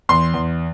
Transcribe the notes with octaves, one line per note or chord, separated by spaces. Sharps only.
E2 C6
E2